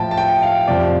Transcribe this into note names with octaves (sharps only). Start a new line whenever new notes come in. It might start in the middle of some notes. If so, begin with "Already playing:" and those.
Already playing: A2 F3 G5 A5
A5
G5
F5
F2 C3 F3 D5